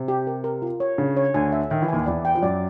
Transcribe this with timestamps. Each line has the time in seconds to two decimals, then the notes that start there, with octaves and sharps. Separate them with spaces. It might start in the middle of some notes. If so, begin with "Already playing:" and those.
Already playing: C3
0.08 G4
0.27 A#4
0.44 A#4
0.62 F4
0.80 C#5
0.98 C#3 D4
1.17 C#5
1.34 D2 D3 G#5
1.52 E5
1.70 D#3 E5
1.82 E3
1.88 D#2 D#3 G#5
2.06 E2 E3 D5
2.25 G5
2.35 F3
2.42 F#2 F#3 D5